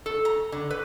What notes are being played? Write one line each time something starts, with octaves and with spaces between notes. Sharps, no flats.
A4
A#5
D3
B4